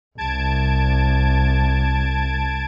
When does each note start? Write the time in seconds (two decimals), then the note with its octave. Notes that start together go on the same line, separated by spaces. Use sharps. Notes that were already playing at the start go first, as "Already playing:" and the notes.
0.18 C2 A5 G#6 D7